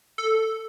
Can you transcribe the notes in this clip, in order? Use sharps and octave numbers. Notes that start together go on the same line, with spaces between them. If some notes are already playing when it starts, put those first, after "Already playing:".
A4